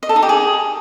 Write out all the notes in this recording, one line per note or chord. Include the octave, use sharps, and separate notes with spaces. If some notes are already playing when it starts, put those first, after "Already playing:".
D#5
A4
D#4
G4
G#4